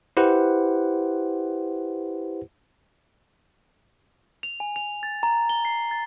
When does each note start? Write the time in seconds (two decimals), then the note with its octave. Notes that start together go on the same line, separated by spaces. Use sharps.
0.17 E4 G4 B4 C5 F#5
4.43 F7
4.60 G#5
4.76 F7
5.03 A6
5.23 A#5
5.49 G7
5.65 C7
5.91 A6